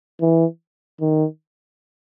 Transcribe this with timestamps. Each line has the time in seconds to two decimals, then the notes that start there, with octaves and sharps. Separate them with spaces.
0.21 E3
1.01 D#3